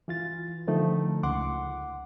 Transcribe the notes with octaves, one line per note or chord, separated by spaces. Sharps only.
E3 F4 A6
D3 D#3 F3 A3 D#4
C#2 F#5 C6 D6